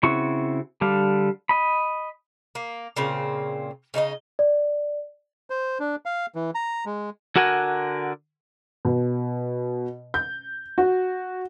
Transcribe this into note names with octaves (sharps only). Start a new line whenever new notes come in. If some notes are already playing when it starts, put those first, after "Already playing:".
C#3 C4 E4 F#4 C#6
D3 G3 D4 F5
D#5 B5
A#3
A#2 C#3 C4
C#3 D#4 C5 D#5
D5
C5
D4
F5
E3
A#5
G#3
D3 F#4 A#4 F#5 G#5
B2
G6
F#4